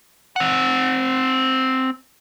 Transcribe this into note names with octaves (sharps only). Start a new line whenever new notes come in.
C4 F#5